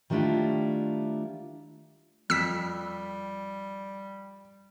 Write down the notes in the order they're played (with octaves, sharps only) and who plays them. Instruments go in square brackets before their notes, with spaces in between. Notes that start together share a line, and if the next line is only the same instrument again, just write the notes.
[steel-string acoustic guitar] D#3 G3 A3 D4 E4 F4
[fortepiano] F2 [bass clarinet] G3 [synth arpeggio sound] E6 B6